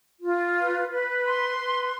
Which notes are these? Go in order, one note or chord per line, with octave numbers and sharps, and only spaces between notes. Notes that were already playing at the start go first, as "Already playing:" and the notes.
F4
B4
B4
C6
B4